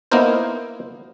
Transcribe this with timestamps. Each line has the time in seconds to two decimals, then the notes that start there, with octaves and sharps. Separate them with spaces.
0.12 A#3 B3 D#4 E4 A#4 C5